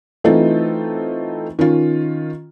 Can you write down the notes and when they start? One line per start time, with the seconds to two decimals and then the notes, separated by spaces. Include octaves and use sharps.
0.24 E3 A3 C4 D#4 F4
1.59 D#3 C#4 F4